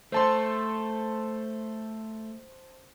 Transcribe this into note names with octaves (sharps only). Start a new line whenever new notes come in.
A3 C5 A5 C6